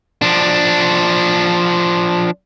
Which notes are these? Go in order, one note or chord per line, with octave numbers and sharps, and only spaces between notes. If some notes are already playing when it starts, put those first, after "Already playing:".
F3 D4